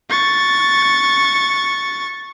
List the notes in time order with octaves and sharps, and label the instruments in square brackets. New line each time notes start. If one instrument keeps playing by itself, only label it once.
[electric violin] C#6 A6